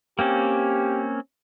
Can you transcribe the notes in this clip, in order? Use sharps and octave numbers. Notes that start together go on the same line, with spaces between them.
A#3 C4 C#4 G4